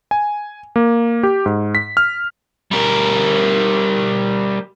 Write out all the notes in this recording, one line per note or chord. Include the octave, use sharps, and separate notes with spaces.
G#5
A#3
G4
G#2
B6
F6
G3 A#4